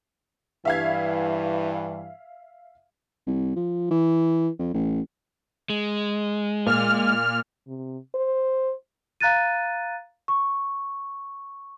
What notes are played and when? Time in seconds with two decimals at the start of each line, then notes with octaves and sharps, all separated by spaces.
0.65 G2 E3 E5 F5 G#6
3.27 C2
3.56 F3
3.91 E3
4.59 F2
4.74 A1
5.70 G#3
6.66 A#2 F6
7.67 C3
8.15 C5
9.20 F5 A#5 F#6 A6 D#7
10.28 C#6